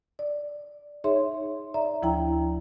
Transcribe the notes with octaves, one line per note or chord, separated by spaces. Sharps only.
D5
D#4 G#4 C#5 E5 C6
D5 E5 A#5
D2 F3 E4 G5 A#5